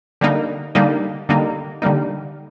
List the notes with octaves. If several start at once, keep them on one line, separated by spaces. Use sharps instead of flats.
D3 G3 A#3 D#4
D3 G3 A#3 D#4
D3 G3 A#3 D#4
D3 G3 A#3 D#4